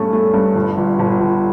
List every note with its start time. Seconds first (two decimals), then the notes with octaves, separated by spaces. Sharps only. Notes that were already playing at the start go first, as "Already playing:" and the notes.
Already playing: G2 A3 C#4
0.13 A3
0.34 G2
0.56 G1
0.78 G1
0.99 G1
1.20 G1